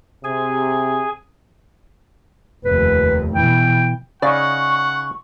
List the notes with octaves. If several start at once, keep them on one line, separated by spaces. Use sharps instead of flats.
C3 G#4 G#5
F1 D#2 B4
B2 E3 G5
C#3 C#4 D#4 D5 F5 F#5 C#6